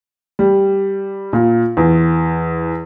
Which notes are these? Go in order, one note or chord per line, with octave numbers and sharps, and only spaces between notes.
G3
A#2
E2